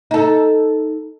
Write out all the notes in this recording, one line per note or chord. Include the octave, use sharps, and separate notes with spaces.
D#4 A4